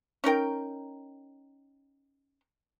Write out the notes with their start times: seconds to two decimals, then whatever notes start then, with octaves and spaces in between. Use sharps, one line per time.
0.24 C#4 D#4 A#4 G5